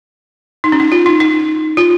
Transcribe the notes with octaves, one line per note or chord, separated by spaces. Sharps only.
D#4
C#4
D#4
F4
D#4
D#4
F4